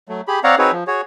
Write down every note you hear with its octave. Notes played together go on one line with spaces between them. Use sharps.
F#3 A3
G4 G#4 B5
C4 C#5 D5 F5 F#5 A#5
C4 D#4 F#4 G#4 B4 C#5
F3
F#4 G#4 C#5